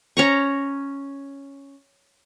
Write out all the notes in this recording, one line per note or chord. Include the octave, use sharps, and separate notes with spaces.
C#4 A#5 C#6